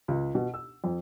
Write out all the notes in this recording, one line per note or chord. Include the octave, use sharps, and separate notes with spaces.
C#2
B2
E6
F2